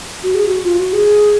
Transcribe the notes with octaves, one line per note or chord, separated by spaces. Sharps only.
F#4
G#4
F#4
F4
F#4
G#4